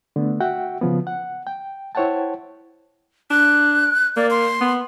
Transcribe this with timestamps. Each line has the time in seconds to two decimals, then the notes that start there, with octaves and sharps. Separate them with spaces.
0.16 D3 A3 B3
0.40 F#4 E5 F#5 G5
0.81 C#3 F3 B3
1.07 F#5
1.47 G5
1.95 E4 C5 C#5 F#5 G5 A5
3.31 D4 F#6
4.17 A#3 D5
4.31 C6
4.61 B3